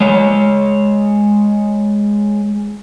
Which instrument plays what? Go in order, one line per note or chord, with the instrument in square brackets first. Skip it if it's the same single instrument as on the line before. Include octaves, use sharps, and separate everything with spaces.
[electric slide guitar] G#3 C#5